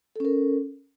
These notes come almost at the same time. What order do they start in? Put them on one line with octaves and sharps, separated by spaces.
A4 C#4 A#4